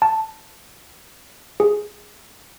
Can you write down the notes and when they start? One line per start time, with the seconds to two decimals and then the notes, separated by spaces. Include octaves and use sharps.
0.02 A5
1.60 G#4